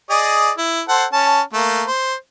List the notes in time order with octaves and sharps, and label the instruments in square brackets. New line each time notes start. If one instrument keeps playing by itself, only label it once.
[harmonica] G#4 D5 D#5
E4
A4 C5 F#5
C#4 A5
A3 A#3
C5